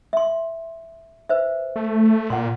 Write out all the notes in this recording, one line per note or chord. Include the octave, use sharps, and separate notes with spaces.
E5 C6
B4 C5 E5
A3
A#2 F#5 C6